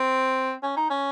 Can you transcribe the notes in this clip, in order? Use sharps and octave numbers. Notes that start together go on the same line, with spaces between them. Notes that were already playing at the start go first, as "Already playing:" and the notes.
Already playing: C4
C#4
D#4
C#4